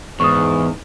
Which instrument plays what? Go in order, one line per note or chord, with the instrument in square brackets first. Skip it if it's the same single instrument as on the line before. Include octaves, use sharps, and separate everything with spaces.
[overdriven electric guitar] E2 [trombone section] G#2 [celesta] C#6 D#6